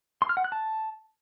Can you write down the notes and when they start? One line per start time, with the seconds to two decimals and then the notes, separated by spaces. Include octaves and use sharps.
0.22 C6
0.29 F6
0.37 F#5
0.44 F#6
0.52 A5